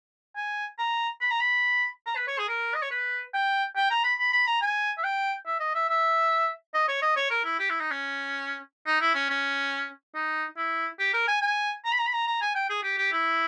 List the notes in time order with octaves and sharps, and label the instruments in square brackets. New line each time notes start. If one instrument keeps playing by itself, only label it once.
[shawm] G#5
A#5
B5
A#5
B5
A#5
B4
C#5
G#4
A#4
D#5
C#5
B4
G5
G5
A#5
B5
B5
B5
A#5
G#5
E5
G5
E5
D#5
E5
E5
D#5
C#5
D#5
C#5
A#4
E4
G4
E4
D#4
C#4
D#4
E4
C#4
C#4
D#4
E4
G4
A#4
G#5
G#5
A#5
B5
A#5
B5
A#5
A#5
G#5
G5
G#4
G4
G4
E4